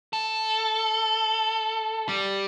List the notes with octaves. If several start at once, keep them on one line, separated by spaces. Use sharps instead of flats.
A4
G3